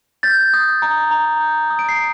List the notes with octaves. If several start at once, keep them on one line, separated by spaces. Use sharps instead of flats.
G6 A6
D#6
A#5
A#5
G6
D#6
D7
C7